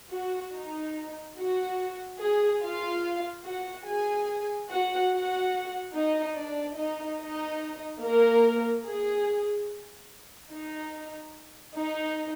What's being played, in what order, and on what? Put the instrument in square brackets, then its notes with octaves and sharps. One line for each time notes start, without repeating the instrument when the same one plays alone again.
[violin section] F#4
D#4
F#4
G#4
F4 F5
F#4 F#5
G#4 G#5
F#4 F#5
F#4 F#5
D#4 D#5
D4 D5
D#4 D#5
D#4 D#5
A#3 A#4
G#4
D#4
D#4